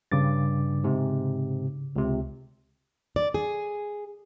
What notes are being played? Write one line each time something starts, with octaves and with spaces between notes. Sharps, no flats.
G2 C#3 D6 A6
G#2 C3
C#2 C3
D5
G#4